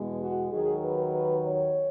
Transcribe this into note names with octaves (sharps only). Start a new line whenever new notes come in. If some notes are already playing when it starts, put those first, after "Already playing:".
Already playing: E2 B2 G#3
F#4
D#2 D#3 F#3 G#4
B4
B4
C#5